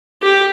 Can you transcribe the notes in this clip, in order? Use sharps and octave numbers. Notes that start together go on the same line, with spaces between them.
G4